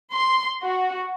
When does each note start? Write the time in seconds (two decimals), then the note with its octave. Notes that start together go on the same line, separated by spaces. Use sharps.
0.13 C6
0.63 F#4